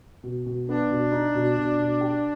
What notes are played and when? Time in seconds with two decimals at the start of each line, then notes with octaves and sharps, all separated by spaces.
0.23 B2
0.46 B2
0.68 B3 D4
0.91 B2
1.12 D#4
1.35 B2
1.57 B2
1.79 B2
2.01 G4